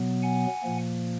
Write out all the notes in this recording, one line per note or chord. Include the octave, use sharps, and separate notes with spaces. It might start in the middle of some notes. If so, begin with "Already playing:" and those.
Already playing: B2 F#3 B3
F#5 G#5
A#2 F3 A#3